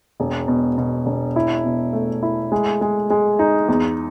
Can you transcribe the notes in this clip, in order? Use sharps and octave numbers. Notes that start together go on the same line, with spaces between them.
E1
B2
B2
E1
E4
B2
A3
E4
G#3
G#3
G#3
D#4
E2